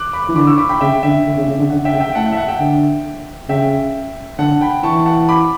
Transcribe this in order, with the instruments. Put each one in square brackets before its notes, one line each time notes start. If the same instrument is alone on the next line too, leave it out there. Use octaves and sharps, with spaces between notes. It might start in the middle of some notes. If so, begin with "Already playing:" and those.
Already playing: [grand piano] D6 F#6
B5 D6
[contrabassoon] E3
[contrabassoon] D3 [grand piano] B5 D6
[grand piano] C#6 E6
B5 D6
G5 B5
[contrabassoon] C#3 [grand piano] E5 G5
[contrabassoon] D3 [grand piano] E5
[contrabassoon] D3
C#3
C#3
D3
[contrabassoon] D3 [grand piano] F#5
[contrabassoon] D3
[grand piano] E5 G5
[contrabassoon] C#3
[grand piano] E5 G5
[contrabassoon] A2 [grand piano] F#5 A5
[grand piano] F#5
E5
F#5
E5 G5
[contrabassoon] D3
[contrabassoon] C#3 [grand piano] E5 G5
[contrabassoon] D3 [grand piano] F#5 A5
[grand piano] G5 B5
[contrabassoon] E3 [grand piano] A5 C#6
[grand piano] F#5 A5
B5 D6